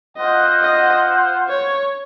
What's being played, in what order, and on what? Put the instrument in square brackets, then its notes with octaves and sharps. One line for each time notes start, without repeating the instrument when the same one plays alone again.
[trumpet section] F4 C5 F#5 [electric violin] D#5
[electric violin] D#5
C#5